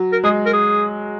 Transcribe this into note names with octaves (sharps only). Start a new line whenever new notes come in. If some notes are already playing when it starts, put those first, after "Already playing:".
Already playing: F#3
A#4
G#3 G#4
A#4
G#4